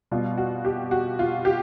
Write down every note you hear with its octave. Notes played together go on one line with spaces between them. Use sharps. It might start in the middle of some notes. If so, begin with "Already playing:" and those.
B2 G3 F4
F#4
G4
F#4
F4
G4